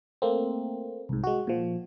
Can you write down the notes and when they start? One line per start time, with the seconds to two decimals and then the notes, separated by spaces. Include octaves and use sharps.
0.22 A3 A#3 C4
1.09 C2 G#2
1.24 G#3 F#4
1.47 A#2 F3